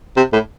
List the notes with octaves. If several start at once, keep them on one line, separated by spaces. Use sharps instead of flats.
C3
A2